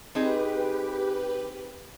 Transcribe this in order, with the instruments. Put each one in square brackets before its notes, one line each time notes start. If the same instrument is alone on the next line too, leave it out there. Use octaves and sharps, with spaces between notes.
[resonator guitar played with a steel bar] C4 D#4 G#4 [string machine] G4 B4